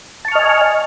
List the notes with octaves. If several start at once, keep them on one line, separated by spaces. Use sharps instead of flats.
D#5 G#5 A5 C#6 F6